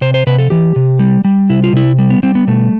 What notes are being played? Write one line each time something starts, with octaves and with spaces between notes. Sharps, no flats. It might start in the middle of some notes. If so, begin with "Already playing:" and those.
C3 C5
C5
C3 B4
A4
E3 G4
C3
G3
G3
C3 E4
F4
C3 E4
G3
B3
G3 C4
B3
B2 A3